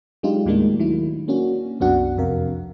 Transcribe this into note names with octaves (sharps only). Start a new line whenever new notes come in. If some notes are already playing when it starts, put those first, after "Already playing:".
F#3 G#3 D4 D#4 F4 G4
D#2 A2 D#3 G#3 A#3 D4
D#3 F#3 E4
A#3 C#4 D4 F#4
C2 F#2 B3 D4 F#4 F#5
F2 C3 A#4 F5